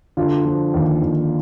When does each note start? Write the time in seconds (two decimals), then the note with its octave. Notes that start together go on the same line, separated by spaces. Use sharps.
0.17 D3 F4
0.45 F3
0.74 D#2
1.02 D#2